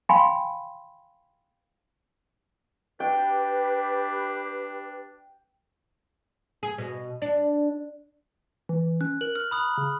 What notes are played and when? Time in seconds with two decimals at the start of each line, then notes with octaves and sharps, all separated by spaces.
0.09 F5 G5 G#5 B5 C6
3.00 D4 G4 B4 G5
6.63 G#4
6.78 B2
7.22 D4
8.69 E3
9.01 C#4 F#6
9.21 A#4 F#7
9.36 F6
9.51 A#5 B5 D#6 F#6
9.78 C#3